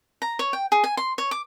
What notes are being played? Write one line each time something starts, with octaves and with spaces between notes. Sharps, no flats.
A#5
C#5
G5
G#4
G#5
C6
C#5
D6